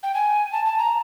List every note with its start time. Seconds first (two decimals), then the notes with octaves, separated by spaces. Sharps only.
0.03 G5
0.14 G#5
0.52 A5
0.65 A5
0.78 A#5